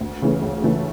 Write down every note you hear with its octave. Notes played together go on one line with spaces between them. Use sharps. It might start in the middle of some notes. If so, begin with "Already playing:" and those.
D2
C#3 E3 A3 C#4
D2
C#3 E3 A3 C#4